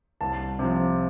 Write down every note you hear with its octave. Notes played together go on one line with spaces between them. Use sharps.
C2 A5
C3 F3